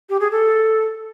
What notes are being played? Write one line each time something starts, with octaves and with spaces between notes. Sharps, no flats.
G4
G#4
A4